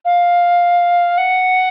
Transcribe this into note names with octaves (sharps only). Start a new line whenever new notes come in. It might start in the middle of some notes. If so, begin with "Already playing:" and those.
F5
F#5